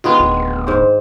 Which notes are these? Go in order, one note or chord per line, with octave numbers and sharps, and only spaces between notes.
D#3 G#3 B3 F4
D1
G#2 C5